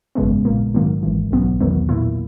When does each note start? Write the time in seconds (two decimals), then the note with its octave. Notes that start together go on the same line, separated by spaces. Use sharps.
0.15 G#1 F#2 C#3 G#3 B3
0.45 A#1 A#2 A#3
0.74 G#2 D#3 F#3 A#3
1.03 G#1 G#2 E3
1.31 B1 B2 F#3 B3
1.61 E2 D#3 F#3 B3
1.89 A#2 A#3 E4